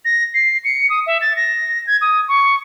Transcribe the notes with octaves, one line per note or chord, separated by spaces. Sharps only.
A#6
C7
C#7
D#6
E5
A6
A#6
G#6
D#6
C#6